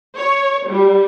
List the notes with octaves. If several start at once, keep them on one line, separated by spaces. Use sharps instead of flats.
C#5
G3